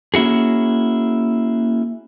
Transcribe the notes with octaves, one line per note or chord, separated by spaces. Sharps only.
A#3 C#4 E4 F#4 G#4